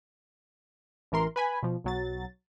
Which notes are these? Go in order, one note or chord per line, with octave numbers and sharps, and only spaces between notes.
A1 E3 A#4 C6
B4 G#5 B5
B2 F3
B1 F#3 A6